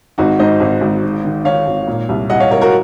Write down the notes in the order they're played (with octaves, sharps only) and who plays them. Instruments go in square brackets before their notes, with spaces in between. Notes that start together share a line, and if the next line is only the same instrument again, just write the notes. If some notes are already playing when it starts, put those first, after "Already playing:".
[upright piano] G#1 [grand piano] D#4 F#4
[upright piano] G#2 [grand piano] C5 D#5
[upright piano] G#1
G#1
G#2
D#3
[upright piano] D#3 [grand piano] C#5 F5
[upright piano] G#1
A#2
C2
[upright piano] C2 [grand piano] D#5 F#5
[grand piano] C#5 F5
[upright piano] C2 [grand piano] A#4 C#5
[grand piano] F#4 A#4